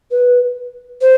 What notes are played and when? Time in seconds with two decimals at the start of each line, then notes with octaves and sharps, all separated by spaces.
0.11 B4
1.01 C5